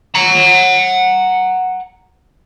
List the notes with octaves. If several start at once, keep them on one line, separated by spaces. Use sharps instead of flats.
F#5 A#5